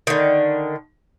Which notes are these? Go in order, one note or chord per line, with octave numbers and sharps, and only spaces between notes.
D3 D#3